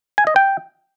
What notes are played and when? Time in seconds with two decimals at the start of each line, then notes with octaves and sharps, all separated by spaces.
0.18 G#5
0.27 D#5
0.36 G5